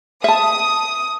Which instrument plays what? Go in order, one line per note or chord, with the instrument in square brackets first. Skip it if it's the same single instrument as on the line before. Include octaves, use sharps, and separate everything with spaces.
[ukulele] E5 A5 [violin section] D#6